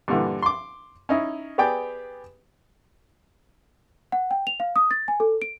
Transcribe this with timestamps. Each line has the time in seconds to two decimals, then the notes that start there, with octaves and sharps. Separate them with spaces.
0.08 G2 A#2 D3 E3
0.42 C6 D6
1.09 C#4 D#4 E4
1.58 B3 G4 G#4 D5 G5
4.12 F#5
4.31 G5
4.47 F7
4.60 F5
4.76 D#6
4.91 A6
5.08 G#5
5.20 A4
5.42 D7